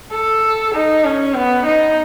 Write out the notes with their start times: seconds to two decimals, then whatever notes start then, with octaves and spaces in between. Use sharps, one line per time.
0.12 A4
0.74 D#4
1.05 C#4
1.35 B3
1.66 D#4